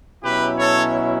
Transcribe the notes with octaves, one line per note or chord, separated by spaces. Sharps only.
B2 F#3 C#4 E4 G4 B4
A4 C#5